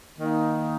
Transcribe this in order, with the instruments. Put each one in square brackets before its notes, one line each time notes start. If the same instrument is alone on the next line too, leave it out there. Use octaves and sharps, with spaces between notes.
[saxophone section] D#3 A#3 D#4